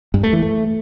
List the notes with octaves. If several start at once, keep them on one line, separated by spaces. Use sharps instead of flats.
G2
A3
E3
A3